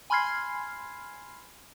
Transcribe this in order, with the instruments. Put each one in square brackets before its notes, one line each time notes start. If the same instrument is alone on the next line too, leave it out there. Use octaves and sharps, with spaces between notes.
[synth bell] G#5 B5 C6 F6 G#6 C7